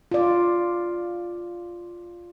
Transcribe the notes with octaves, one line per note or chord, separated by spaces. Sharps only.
F4 D5